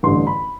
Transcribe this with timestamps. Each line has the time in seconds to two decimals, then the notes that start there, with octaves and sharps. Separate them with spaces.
0.03 A1 G2 D3 C6
0.27 B5